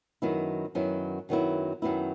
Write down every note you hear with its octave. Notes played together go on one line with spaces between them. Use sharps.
F#2 D#3 F#3 B3 E4
F#2 D#3 F#3 B3 E4
F#2 D#3 F#3 B3 E4
F#2 D#3 F#3 B3 E4